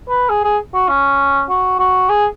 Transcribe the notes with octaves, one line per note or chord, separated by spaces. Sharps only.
B4
G#4
G#4
F#4
C#4
F#4
F#4
G#4